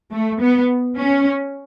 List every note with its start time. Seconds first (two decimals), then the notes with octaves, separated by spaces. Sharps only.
0.12 A3
0.41 B3
0.97 C#4